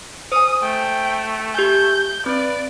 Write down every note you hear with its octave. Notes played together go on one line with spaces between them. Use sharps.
C5 G#5 D#6
A3 G5
G4 G#5 G6
C4 B4 D5